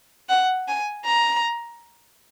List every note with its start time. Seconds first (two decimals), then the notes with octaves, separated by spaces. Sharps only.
0.29 F#5
0.68 G#5
1.06 A#5